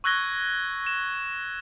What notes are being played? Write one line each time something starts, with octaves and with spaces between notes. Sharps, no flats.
C#6 E6 F#6 G#6 A#6 G7
E7